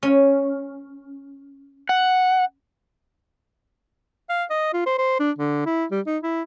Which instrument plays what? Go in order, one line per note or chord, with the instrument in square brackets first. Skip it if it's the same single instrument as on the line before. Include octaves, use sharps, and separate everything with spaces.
[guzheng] C#4
[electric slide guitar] F#5
[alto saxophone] F5
D#5
F4
C5
C5
D4
D3
E4
G3
D#4
E4